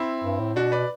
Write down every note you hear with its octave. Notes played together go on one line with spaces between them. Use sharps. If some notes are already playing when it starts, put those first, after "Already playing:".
Already playing: C4 E4
G2
A2
B2 D4 F#4
B4 D5